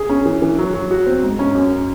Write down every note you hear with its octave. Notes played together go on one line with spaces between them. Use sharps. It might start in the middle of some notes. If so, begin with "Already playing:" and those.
Already playing: G#4
C#4
E3
E3
F#3
F#3
F#4
C4
G#2
C#4
F#2